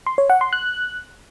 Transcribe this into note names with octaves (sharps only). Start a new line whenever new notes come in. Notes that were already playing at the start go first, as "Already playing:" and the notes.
C6
C#5
F#5
C6
F#6